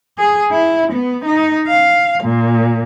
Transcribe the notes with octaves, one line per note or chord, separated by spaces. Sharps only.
G#4
E4
B3
D#4
F5
A#2